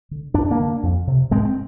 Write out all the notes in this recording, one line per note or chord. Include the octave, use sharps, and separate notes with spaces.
D3
G2 D4
A#3 D4
D3
F2
C3
G#2 G#3 C4
C4